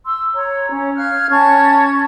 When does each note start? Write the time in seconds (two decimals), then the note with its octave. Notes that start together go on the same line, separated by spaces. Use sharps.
0.06 C6 E6
0.34 C#5 A#5
0.71 C#4
0.96 F5 F6 F#6 G#6
1.29 C#4 A5 C#6 G#6